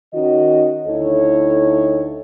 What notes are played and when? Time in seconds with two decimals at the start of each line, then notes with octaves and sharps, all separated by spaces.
0.14 D#3 C#4 F#4 D#5
0.87 D2 D#4 E4 A4 C#5